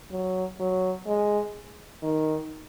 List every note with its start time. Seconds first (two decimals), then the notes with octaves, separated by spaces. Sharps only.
0.11 F#3
0.60 F#3
1.07 G#3
2.03 D#3